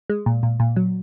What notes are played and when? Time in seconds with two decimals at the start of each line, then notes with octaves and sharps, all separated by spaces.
0.10 G#3
0.26 A#2
0.43 A#2
0.60 A#2
0.76 F#3